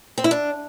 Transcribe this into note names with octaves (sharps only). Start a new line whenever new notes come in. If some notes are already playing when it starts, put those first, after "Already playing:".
C4
E4
D4